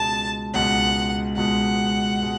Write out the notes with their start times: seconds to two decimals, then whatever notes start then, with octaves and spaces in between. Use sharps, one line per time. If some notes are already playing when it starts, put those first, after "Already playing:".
Already playing: C#2 B2 G#3 A5
0.54 C#2 B2 G#3 F#5
1.37 C#2 B2 G#3 F#5
2.22 B2 G#3